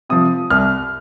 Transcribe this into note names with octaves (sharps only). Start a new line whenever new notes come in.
C3 F3 D#6
C2 F6